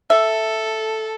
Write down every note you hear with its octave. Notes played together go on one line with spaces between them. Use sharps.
A4 E5